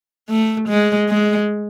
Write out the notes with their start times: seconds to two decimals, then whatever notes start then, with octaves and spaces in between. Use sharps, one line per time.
0.30 A3
0.69 G#3
1.09 G#3